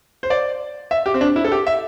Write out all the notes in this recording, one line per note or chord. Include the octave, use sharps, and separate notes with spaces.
C5
D5
E5
G4
C4
D4
E4
A4
G4
E5